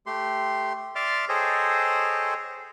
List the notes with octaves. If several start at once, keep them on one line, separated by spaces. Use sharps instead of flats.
A3 G4 C6
D5 E5 C6 D6 F6
G#4 A4 C5 C#5 D#5 G5